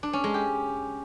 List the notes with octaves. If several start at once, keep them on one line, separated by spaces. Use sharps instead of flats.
D4
C#4
G#3
G4